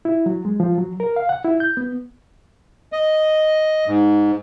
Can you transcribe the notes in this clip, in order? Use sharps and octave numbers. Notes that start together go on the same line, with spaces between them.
E4
F#3
G#3
F3
F#3
A#4
F5
F#5
E4
G6
B3
D#5
G#2